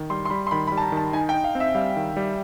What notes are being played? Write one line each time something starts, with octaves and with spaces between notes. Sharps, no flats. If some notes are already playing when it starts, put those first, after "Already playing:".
Already playing: D#3
G3 C6
C6
G3 B5
C6
D#3 B5
B5
G3
A5
A#5
D#3
A5
D#4 G#5
G5
D#4
F5
C4
E5
G3 F5
D#3
G3